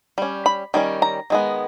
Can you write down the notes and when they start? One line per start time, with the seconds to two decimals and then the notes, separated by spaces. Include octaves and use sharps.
0.18 G3 C#4
0.46 B5
0.74 D#3 G3 C#4
1.02 A#5
1.30 D#3 G#3 B3